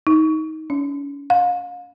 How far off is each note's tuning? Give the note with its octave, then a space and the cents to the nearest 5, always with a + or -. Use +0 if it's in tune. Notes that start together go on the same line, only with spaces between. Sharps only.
D#4 +20
C#4 +35
F5 +35